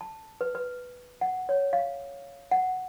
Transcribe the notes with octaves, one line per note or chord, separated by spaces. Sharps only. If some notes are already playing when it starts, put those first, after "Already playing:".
A5
B4
B4
F#5
C#5
F5
F#5